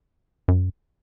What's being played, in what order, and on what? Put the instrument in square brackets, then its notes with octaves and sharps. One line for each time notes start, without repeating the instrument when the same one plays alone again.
[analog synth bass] F#2